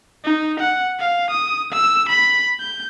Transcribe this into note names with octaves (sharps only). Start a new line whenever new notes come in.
D#4
F#5
F5
D#6
E6
B5
G6